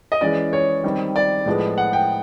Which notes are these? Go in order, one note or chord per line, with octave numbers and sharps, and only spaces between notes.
D#5
E3 G#3 C#4 D5
C#5
D#3 G3 C4
D5
A2 F3 G#3 B3
F#5
G5